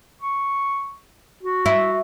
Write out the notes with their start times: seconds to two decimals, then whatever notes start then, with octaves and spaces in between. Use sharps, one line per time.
0.21 C#6
1.43 F#4
1.66 E4